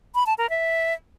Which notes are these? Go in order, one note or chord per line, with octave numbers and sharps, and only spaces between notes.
B5
A5
A#4
E5